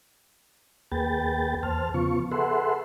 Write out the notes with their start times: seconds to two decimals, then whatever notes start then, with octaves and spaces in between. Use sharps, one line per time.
0.92 D#2 A#3 G#4 B4 G5 A6
1.63 E2 C5 A5 F6
1.94 C#3 F3 B3 F4 C#6
2.31 G#4 A4 B4 E5 F#5 C6